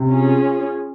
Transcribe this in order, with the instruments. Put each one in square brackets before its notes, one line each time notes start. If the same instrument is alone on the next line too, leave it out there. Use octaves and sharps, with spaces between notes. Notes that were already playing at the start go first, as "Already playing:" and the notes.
Already playing: [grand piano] C3
[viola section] C#4 F4 G#4